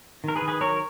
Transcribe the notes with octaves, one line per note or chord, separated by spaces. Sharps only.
D#3 A#4
G#4 B4
D#3
G#4 B4
F#3 A#4 C#5